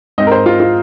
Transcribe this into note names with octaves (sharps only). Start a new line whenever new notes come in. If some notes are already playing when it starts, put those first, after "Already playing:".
G#2 G#3 C4 D#5
A#4
C5
F4
F4